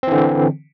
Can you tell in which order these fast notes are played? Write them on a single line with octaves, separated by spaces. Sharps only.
C4 E3 D3